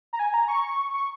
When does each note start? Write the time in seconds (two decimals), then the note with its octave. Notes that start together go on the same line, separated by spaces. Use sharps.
0.13 A#5
0.19 G#5
0.34 A#5
0.48 C#6
0.94 C#6